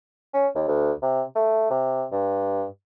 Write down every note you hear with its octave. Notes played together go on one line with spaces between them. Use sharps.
C#4
D#2
D2
C3
A3
C3
G2